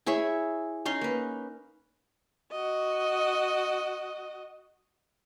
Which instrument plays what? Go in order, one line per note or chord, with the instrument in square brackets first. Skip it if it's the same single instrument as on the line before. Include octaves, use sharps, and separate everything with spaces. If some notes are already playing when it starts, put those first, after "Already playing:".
[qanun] E4 G#4 C#5 E5
C#4 D#4 C6
A#3 B4
[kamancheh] F#4 D#5